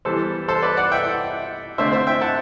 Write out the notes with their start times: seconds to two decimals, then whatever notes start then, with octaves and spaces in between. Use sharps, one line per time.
0.05 E3 G3 B3 A4 C5
0.48 A4 C5
0.62 B4 D5
0.77 D5 F#5
0.91 E5 G5
1.78 D3 A3 C4 C5 E5
1.92 C5 E5
2.07 E5 G5
2.21 F#5 A5